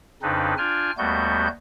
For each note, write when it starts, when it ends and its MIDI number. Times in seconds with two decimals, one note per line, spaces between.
0.22 0.54 41
0.22 0.54 49
0.22 0.54 60
0.22 0.54 62
0.22 0.54 63
0.22 0.54 71
0.58 0.91 62
0.58 0.91 65
0.58 0.91 79
0.58 0.91 80
0.58 0.91 89
0.98 1.48 39
0.98 1.48 55
0.98 1.48 57
0.98 1.48 59
0.98 1.48 66
0.98 1.48 91